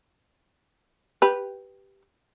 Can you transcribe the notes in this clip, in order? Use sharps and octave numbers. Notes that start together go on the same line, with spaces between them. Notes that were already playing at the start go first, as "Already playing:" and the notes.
G4 B4